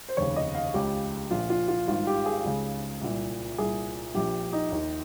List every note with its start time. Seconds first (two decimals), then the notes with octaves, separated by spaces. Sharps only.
0.09 C5
0.17 F1 D#2 C#3 C#5
0.36 D#5
0.55 F5
0.74 C#2 C#3 G4
1.31 A#1 A#2 F4
1.50 F4
1.68 F4
1.88 G#1 G2 D#3 F4
2.07 G4
2.26 G#4
2.45 C#2 C#3
3.01 C2 A#2
3.58 C2 A#2 G#4
4.14 A#1 A#2 G4
4.53 D#4
4.72 D#2 D#3